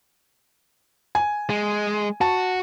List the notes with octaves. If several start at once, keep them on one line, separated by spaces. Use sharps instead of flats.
G#5
G#3
F#4 A5